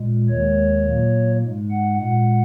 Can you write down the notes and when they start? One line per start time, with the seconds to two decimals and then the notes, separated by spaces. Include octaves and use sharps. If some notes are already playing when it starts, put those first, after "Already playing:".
Already playing: A#2 G#3
0.29 D#2 D#3 G#3 C#5
0.85 A#2 F#3 A#3
1.42 G#2 G#3
1.71 F#5
1.98 A#2 G#3 F#5